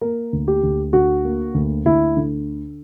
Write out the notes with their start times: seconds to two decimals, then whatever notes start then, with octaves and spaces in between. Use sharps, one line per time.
0.01 A#3 A#4
0.33 D2
0.48 G4
0.63 D2
0.93 D3 F#4
1.25 A#3
1.54 D2
1.85 D2 E4
2.16 D3